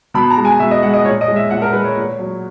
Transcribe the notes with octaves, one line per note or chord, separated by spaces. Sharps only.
B2 B5
A#5
G#3
G#5
B2 E5
D#5
G#3 F#5
D#5
A#2 C#5
D#5
G#3
E5
A#2 F#5
A#4
G#3 B4
C#5
A#2
F#3